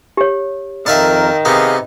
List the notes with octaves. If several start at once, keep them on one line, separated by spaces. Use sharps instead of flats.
G4 C#5
F2 D#3 A#4 E5 F5 A5
C3 B3 D#4 G#4 D#5 F5